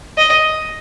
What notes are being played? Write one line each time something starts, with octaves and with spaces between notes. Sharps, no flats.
D#5